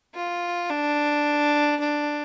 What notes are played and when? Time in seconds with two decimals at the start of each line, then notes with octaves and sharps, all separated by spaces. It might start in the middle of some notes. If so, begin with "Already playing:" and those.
0.15 F4
0.70 D4
1.80 D4